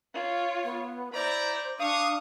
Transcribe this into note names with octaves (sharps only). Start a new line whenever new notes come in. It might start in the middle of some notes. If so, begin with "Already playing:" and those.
F4 C#5
B3
E4 C5 D5 A#5
D4 F5 C#6 D#6